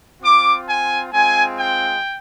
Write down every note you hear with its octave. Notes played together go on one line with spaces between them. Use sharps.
C4 F4 D6
G#5
G#3 C4 F4 G#5
G5